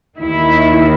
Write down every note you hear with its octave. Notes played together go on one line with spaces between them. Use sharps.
D#2 D#3 E4